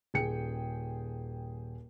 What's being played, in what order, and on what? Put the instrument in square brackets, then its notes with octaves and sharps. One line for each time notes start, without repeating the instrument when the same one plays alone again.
[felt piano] D#1 G#4 G5 C#7